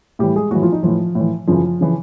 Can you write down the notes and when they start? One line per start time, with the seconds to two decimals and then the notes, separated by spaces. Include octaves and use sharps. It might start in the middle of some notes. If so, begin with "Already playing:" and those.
0.19 A2 E3 G3 G4
0.36 G#3 G#4
0.51 A2 E3 F#3 F#4
0.62 F3 F4
0.72 D#4
0.83 A2 E3 F3 F4
1.15 A2 E3
1.47 F#2 C#3 E3 F3 F4
1.81 C#3 E3